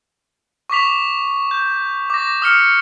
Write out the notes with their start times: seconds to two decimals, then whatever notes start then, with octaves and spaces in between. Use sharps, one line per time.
0.70 C#6 D6 B6 F7
1.51 G6
2.10 D6 A#6
2.42 D#6 F6 C#7